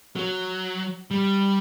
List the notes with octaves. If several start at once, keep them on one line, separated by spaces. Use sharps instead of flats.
F#3
G3